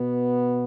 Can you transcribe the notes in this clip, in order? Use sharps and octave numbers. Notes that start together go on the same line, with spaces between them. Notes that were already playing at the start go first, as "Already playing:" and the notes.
Already playing: B2 B3